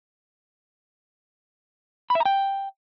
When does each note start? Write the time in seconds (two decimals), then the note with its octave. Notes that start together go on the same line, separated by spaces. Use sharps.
2.10 B5
2.15 E5
2.20 A#5
2.25 G5